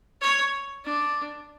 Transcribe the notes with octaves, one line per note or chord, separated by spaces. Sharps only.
C#5
D4